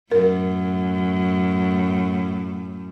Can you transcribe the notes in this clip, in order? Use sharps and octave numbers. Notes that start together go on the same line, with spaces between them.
F#2 A2 A#4